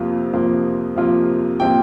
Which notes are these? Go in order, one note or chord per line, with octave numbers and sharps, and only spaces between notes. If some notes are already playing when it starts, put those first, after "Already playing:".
Already playing: F2 C3 F3 A#3 F4
F2 C3 F3 A#3 F4
F2 C3 F3 A#3 F4
C3 F3 A#3 F4 G5